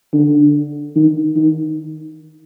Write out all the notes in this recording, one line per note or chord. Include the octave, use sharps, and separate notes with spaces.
D3
D#3
D#3